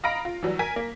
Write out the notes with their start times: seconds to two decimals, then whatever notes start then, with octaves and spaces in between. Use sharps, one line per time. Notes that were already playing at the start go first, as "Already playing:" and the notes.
0.04 D#5 F5 A#5 B5 A#6 D7
0.25 F4
0.43 E3 F#3 G3
0.59 A#4 G#5 B6
0.76 A#3